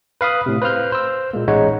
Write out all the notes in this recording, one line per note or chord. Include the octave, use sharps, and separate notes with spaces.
B4 F5 B5 D#6
A2 C3
B4 C5 F5 F6 G6
C5 E6
A#2 G#3 A#3
A1 G#3 D#4 C#5 F#5